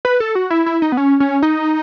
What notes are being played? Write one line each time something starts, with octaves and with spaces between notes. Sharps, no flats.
B4
A4
F#4
E4
E4
D#4
B3
C#4
C#4
D#4